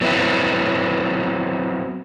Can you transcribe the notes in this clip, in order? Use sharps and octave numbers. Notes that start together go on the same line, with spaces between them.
F#3 B3 C4 E4